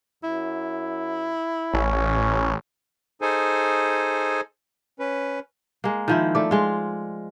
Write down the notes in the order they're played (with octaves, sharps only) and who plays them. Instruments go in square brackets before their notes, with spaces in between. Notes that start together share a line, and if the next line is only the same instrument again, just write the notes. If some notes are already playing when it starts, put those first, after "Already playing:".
[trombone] F#2 [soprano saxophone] E4
[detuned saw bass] A1 [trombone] C#4
[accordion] D#4 G#4 A4 C5 G#5
C#4 B4
[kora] G#3 A#3
D#3 F3 E4
A3 D5
G#3 F4